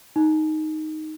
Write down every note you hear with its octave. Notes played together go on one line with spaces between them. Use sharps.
D#4